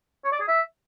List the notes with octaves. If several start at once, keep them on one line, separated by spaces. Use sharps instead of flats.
C#5
D5
G#4
E5